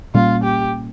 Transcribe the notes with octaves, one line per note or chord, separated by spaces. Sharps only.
A#2 G3 A#3 C#4 F4
G4